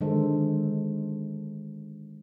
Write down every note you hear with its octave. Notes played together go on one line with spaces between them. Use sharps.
D3 D#3 G#3 A4 C5